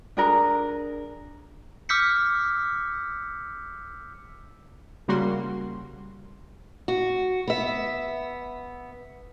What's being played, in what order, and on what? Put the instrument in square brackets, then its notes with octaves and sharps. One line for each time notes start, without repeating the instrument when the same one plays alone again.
[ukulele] D4 G#4 A#4
[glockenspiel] D6 E6 F6 G6 B6 C#7
[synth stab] C#3 G3 A#3 F#4 C6
[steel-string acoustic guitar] F#4
B3 E5